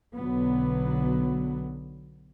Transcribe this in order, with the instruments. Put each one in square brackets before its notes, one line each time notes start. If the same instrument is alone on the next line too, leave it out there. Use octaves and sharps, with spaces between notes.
[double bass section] B1 D3 F#3 B3